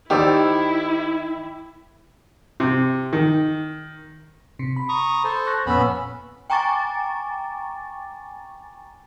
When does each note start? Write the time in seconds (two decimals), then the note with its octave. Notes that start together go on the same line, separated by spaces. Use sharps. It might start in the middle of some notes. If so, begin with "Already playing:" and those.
0.10 D#3 E4 G4 C5 D5 G5 D6 E6
2.60 C3
3.13 D#3
4.59 C3
4.76 B5
4.89 A#5 C#6 D#6
5.24 A4 C5
5.46 C#6 F#6 A#6
5.66 F2 A#2 B3 C#4 B5 E6
6.50 G5 G#5 A#5 C#6 D6 A6